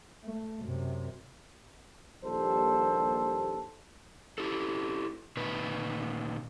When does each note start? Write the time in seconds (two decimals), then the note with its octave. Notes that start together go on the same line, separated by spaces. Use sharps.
0.24 A3
0.64 F#2 C3
2.25 A#1 D#2 G3 A4 C5
4.38 E4 G4 A4
5.37 A#2 D#3 B4